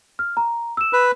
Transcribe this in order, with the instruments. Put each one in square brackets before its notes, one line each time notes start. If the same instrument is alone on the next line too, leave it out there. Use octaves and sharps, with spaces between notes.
[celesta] F6
A#5
E6 E7
[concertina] B4